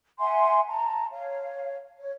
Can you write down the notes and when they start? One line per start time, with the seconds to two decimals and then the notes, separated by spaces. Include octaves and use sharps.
0.19 E5 F#5 G#5 C6
0.69 A5 A#5
1.13 C#5 F5
1.99 C#5